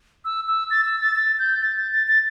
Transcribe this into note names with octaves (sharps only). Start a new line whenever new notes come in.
E6
E6
A6
E6
A6
A6
G6
A6
A6
A6
A6